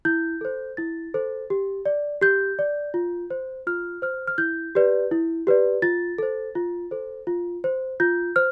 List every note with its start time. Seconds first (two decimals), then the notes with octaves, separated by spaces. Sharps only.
0.05 E4 G6
0.41 A4 C5
0.77 E4 A6
1.14 A4 C5
1.50 G4
1.86 D5
2.21 G4 G6
2.59 D5
2.94 F4
3.30 C5
3.67 F4 F6
4.02 C5 F6
4.27 F6
4.38 E4 G6
4.75 G4 B4 D5
5.11 E4
5.47 G4 B4 D5
5.82 F4 A6
6.18 A4 C5
6.55 F4
6.91 A4 C5
7.27 F4
7.64 C5
8.00 F4 G6
8.36 C5 F6